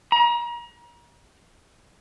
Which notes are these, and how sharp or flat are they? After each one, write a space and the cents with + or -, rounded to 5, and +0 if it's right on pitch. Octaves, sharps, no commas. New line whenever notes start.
A#5 +35